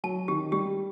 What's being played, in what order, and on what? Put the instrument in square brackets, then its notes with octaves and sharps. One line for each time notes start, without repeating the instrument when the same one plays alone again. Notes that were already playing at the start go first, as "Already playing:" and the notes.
[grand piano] F#3 [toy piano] A5
[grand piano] D#3 [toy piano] G4
[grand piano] G3 [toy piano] G4